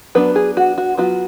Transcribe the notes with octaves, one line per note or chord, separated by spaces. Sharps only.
F#3 B3 D4 B4
G#4
F#4
F#4
F#3 B3 F4 F#4